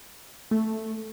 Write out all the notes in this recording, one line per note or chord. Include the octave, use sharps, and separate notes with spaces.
A3